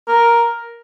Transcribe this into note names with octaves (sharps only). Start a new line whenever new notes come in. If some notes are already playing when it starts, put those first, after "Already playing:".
A#4